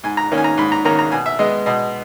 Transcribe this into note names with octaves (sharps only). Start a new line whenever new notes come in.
G#2 G#5
A#5
D#3 A#3 C#4
G#5
A#5
G#2 B5
A#5
D#3 A#3 C#4 A#5
A#5
B2 G#5
E5
G#3 B3 D#5
B2 D#5